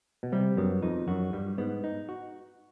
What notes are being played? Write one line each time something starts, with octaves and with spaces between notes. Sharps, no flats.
B2
C3 G3
F#2 B3
F2 D#4
F#2 F#4
G2 G3
G#2 B3
D#4
F#4